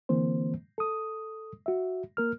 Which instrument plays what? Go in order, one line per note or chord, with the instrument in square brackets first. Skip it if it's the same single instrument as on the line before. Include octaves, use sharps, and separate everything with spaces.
[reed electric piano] D3 E3 A#3 C4 C5
A4 D#6
F#4 E5
A#3 A#4 F6